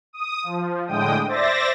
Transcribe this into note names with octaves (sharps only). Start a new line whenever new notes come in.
D#6
F3
A2 D3 G#3 G5 D#6
C5 D5 E5 A6 A#6